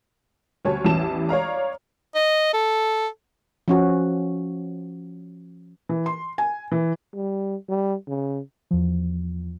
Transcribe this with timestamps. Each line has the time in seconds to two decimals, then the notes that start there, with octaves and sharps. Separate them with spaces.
0.65 D2 G3 C#5 A5
0.85 A1 E2 G3 E4 A5 E7
1.29 C#5 D5 F5 A#5
2.15 D#5
2.54 A4
3.68 F3 C#4 F#4
5.89 E3
6.06 C6
6.38 G#5
6.72 E3
7.14 G3
7.69 G3
8.07 C#3
8.71 E2 F3